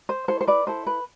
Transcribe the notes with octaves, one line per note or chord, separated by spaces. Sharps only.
C5
E4 A4 C5
C5
B4 D5
E4 A4 C5
B4